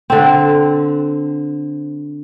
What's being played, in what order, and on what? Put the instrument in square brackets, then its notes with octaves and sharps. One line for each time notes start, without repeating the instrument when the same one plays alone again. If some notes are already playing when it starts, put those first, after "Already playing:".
[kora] D3 C4